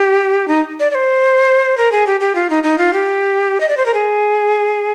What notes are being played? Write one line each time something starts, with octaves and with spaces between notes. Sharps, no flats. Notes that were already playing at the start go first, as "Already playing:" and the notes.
Already playing: G4
D#4
D5
D5
C5
A#4
G#4
G4
G4
F4
D#4
D#4
F4
G4
D#5
D5
C5
A#4
G#4